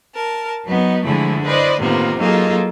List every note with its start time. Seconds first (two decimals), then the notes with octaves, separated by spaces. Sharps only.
0.13 A#4 A5
0.65 F#3 B3 D#4
1.04 D3 E3 F3 G#3 A3 E4
1.44 E4 B4 C5 D5 D#5
1.79 A2 C3 D#3 A#3 B3 F4
2.18 F#3 A#3 D#4 F4 G#4 A4